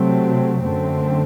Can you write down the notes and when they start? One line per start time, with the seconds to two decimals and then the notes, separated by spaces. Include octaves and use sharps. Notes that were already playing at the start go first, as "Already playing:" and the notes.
Already playing: C3 F#3 A3 C4
0.63 F#2 D3 A3 C4